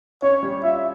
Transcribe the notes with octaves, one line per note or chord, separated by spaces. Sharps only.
C#4 C#5
G3
F4 E5